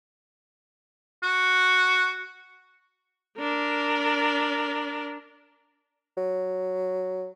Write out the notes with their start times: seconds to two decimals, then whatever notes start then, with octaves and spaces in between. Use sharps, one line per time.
1.23 F#4
3.39 D4 A#4
6.17 F#3